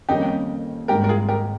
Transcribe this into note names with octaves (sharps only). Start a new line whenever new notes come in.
F2 D#3 G3 A#3 C#4 D#4 G4
G#1 G#2 G3 G4 A#4
A#4
F4 G#4
G4 A#4